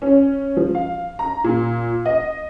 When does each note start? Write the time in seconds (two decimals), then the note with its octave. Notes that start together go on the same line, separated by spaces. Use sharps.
0.02 C#4
0.57 F3
0.75 F5
1.19 A#5
1.44 A#2
2.06 D#5